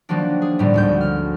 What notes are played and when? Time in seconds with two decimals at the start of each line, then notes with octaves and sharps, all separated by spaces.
0.09 D#3 F3 F#3 A#3 D4
0.42 G#4
0.59 G1 A2 G3
0.74 G#1 D2 G6
1.01 F6